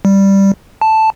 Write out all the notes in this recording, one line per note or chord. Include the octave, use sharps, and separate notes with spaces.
G3
A5